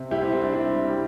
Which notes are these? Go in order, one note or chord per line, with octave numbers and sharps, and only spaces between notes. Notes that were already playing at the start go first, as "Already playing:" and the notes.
Already playing: C3
C2 E4 G4
C4 E4
C2 C4
D4
C3 C4 E4
G3
G4